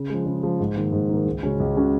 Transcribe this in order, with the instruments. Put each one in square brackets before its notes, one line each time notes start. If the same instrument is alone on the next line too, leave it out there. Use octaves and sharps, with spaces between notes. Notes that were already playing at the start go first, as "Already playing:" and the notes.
Already playing: [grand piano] C#3
F3 G#3
C#3
F3 G#3
G#2
D#3 A#3
G#2
D#3 A#3
C#2
C#3 G#3 C#4 F#4
C#2
C#3 G#3 C#4 F#4